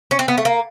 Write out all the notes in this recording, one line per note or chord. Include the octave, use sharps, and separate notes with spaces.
C#4
C4
B3
A3
A#3